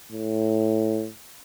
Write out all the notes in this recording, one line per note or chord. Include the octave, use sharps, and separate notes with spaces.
A2